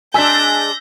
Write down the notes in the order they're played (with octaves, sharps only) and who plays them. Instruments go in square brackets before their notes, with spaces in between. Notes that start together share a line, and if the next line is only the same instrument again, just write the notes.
[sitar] G#3 D4 [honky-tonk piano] G#5 E6 B6 [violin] G6 A#6